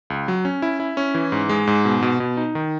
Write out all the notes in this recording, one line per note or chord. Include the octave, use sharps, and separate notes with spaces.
C#2
F#3
C#4
E4
E4
C#4
E3
G#2
G#3
G#2
B2
B2
B2
D#4
D#3